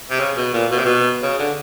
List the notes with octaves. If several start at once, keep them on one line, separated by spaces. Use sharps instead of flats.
C3
C#3
B2
A#2
B2
C3
B2
C#3
D3